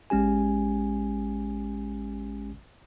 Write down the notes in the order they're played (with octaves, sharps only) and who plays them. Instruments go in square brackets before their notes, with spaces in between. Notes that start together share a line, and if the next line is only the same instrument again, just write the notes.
[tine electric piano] A1 G#3 C#4 G4 G#5